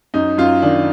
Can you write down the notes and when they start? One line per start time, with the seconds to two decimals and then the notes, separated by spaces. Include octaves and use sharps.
0.14 F#2 D#4
0.38 F#2 F4
0.62 D#3 D4